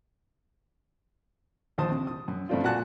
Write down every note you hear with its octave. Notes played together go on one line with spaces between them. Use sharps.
A#1 D#2 C5 A5 D#6
C3
D#6
F#2
G2 A3 C4 D4 F4
A#2 F#4 F#5 G#5 A5 F#6